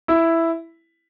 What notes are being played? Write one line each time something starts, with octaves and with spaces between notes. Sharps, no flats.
E4